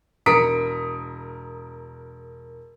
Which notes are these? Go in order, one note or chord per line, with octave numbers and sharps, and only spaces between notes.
E1 A#4 D#6 B6 C#7 D7